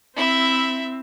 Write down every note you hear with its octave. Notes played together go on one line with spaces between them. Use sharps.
C4 E4 E5